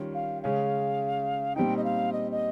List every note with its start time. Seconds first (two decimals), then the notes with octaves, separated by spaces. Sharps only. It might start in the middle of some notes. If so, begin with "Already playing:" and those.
Already playing: D#3 G3 C#4 F4
0.14 F5
0.43 C#3 G#3 C#4 F5
1.56 A#2 G3 C4 D#4 G5
1.77 D#5
1.84 F5
2.13 D#5
2.32 D#5